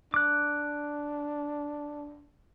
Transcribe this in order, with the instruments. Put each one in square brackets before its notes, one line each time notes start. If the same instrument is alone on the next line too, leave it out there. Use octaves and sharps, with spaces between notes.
[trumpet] D4 [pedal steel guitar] D6 F#6